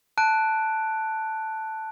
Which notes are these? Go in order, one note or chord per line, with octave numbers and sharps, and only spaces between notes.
A5 F#6 D7